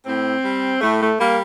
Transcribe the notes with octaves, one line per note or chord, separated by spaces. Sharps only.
A2 C4
G3
A2 A3
A3
G3 A#3